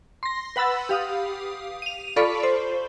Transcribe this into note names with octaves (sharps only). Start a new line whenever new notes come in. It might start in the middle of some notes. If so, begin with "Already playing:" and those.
C6 A#6
B4 F#5 B5 E6 A6
G4 F5 D#6
D#7 F7
F4 A4 D5 B5 C#6
C5